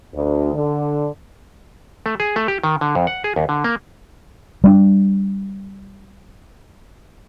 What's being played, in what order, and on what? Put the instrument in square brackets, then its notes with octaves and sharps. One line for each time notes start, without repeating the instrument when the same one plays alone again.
[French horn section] D2
D3
[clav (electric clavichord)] A3
G#4
A3
G4
D#3
D3
F2
F#5
G#4
D#2
D3
A#3
[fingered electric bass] G3 A3 D4